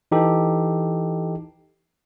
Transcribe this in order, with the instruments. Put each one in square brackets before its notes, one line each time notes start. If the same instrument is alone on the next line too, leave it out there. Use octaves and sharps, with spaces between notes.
[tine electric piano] E3 D#4 G4 A4